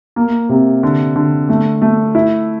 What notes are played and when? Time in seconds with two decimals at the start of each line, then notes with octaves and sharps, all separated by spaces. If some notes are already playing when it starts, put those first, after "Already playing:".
0.16 A#3
0.49 C3
0.83 D3
1.16 D3
1.49 A3
1.82 A3
2.15 E4